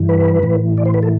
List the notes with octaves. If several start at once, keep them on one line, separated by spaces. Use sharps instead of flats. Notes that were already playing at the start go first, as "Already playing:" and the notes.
Already playing: G2 E3
B4
A2 E3
D5
C5
B4
A4